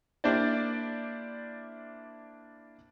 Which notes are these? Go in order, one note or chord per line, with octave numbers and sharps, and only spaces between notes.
A#3 D4 E4 G4 C5 D5